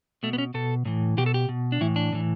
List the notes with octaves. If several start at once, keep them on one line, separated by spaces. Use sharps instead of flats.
B2 A3
B3
C#4
B2 A4
A2 E3
B2 G4
A4
G4
B2
D4
A2 E3 E4
D4
A2 E3